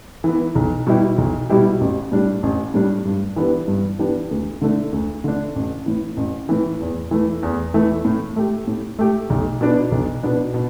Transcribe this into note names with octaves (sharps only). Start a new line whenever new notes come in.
E3 B3
B1
B2 G3 E4 G4
B1
B2 G3 E4 G4
A1
A2 G3 D4
A1
A2 G3 D4
G2
E3 B3 D4 G4
G2
E3 B3 D4 G4
D2
D3 A3 D4
D2
D3 A3 D4
A1
A2 E3
A1
A2 E3
E2
E3 A3
E2
E3 A3
A2
A3 G4
A2
A3 G4
B1
B2 B3 D4
B1
B2 B3 D4
B2